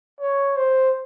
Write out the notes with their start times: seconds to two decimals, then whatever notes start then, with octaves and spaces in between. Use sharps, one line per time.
0.20 C#5
0.57 C5